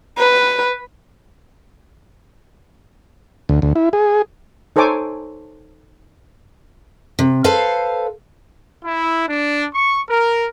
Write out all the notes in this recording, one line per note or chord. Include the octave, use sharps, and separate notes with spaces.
B4
D2
D2
E4
G#4
D#4 A4 C5 C#5 G#5 D6
C3
A4 B4 C5 F5
E4
D4
C#6
A#4